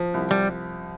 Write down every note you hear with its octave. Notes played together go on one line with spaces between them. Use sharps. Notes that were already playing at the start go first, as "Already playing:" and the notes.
Already playing: F3
C2
G3